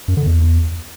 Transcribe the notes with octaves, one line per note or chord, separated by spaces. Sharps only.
F#2
D3
E2